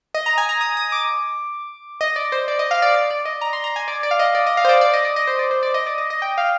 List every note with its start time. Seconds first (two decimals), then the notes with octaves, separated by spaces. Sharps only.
0.14 D#5
0.26 A#5
0.38 G#5
0.49 A#5
0.61 D#6
0.77 D#6
0.92 D6
2.01 D#5
2.16 D5
2.32 C5
2.48 D5
2.59 D#5
2.71 F5
2.82 D5
2.94 D5
3.11 D5
3.25 D#5
3.41 A#5
3.53 C6
3.64 A#5
3.76 G#5
3.88 D5
4.03 D5
4.11 F5
4.19 D#5
4.35 D5
4.47 D#5
4.57 F5
4.65 C5
4.69 D5
4.81 D5
4.94 D#5
5.05 D5
5.16 D#5
5.27 C5
5.39 D5
5.51 C5
5.63 D5
5.74 D#5
5.86 D5
5.98 D#5
6.10 D#5
6.22 G5
6.38 F5